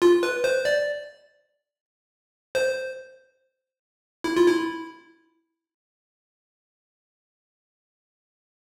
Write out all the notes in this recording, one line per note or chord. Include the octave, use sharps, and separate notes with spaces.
F4
B4
C5
D5
C5
E4
F4
E4